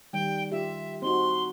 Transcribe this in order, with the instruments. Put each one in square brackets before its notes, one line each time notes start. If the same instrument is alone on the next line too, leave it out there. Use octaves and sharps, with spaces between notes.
[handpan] D#3 G3 [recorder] G5
[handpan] F4 G4 [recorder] E5
[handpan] C4 D#4 F#4 [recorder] C6